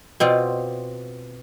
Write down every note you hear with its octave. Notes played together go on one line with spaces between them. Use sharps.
B2 C4 F4 D5